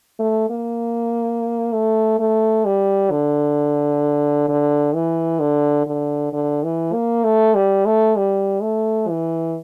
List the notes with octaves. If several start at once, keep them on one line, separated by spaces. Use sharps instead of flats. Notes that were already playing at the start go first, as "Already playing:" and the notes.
A3
A#3
A3
A3
G3
D3
D3
E3
D3
D3
D3
E3
A#3
A3
G3
A3
G3
A3
E3